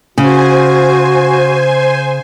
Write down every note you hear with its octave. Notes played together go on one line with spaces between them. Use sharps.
C#3 F#4 C5 G#5